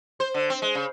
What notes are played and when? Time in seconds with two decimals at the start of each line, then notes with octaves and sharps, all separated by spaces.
0.20 C5
0.34 D3
0.50 C4
0.62 G#3
0.75 C#3